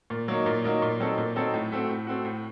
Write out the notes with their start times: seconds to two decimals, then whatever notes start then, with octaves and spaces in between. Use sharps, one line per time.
0.10 A#2
0.28 F#3 A#3 D#4
0.46 A#2
0.64 F#3 A#3 D#4
0.82 A#2
1.00 F#3 C4 D#4 A4
1.17 A#2
1.36 F#3 C4 D#4 A4
1.54 A2
1.72 A3 C4 F#4
1.89 A2
2.07 A3 C4 F#4
2.25 A2